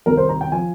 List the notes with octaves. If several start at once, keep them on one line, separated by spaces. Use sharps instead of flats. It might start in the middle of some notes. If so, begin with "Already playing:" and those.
C2 C3 D#3 A#4
C5
A#5
G5
F3 G#5